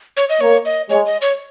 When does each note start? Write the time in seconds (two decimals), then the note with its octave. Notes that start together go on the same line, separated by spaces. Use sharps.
0.17 C#5
0.29 D#5
0.41 A#3 C#5
0.65 D#5
0.89 G#3 C#5
1.06 D#5
1.21 C#5